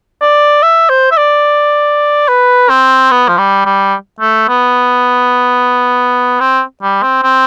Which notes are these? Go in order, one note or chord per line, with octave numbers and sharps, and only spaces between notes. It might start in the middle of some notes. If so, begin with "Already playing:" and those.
D5
E5
C5
E5
D5
B4
C4
B3
F3
G3
G3
A3
B3
C4
G3
C4
C4